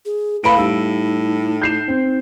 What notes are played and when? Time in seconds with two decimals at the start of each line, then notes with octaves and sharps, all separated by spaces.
0.05 G#4
0.44 A2 B4 F5 B5 D7
0.57 G3 D#4 E6
1.62 G6 C7 E7
1.88 C4